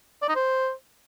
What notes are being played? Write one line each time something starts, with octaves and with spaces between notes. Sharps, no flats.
D5
D#4
C5